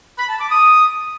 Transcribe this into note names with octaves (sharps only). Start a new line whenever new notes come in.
B5
A5
D6
D#6